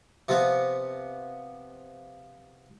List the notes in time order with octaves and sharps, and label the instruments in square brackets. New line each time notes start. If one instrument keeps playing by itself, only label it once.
[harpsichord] C3 F3 B3